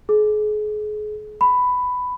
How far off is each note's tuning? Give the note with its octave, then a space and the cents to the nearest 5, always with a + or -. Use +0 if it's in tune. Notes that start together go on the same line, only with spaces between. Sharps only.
G#4 +35
B5 +10